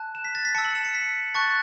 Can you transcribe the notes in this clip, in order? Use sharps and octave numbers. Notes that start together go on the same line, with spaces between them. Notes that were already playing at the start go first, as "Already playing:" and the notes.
Already playing: A5 F#6
E7
B6
A6
B6
A5 E6 C#7
F#7
E7
C#7
B6
A5 C#6 F#6 A6